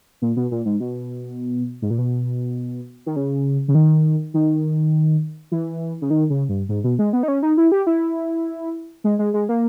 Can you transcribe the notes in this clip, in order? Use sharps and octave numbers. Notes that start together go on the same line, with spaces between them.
A#2
B2
A#2
G#2
B2
G#2
A#2
B2
D#3
C#3
C#3
D#3
D#3
E3
C#3
D#3
C#3
G2
G#2
B2
G#3
B3
D#4
C#4
D#4
E4
G4
E4
G#3
G#3
G#3
A#3